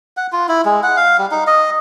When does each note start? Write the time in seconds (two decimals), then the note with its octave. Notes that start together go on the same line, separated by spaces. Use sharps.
0.17 F#5
0.32 F4
0.49 E4
0.65 G#3
0.83 F#5
0.97 F5
1.18 G3
1.31 D#4
1.47 D#5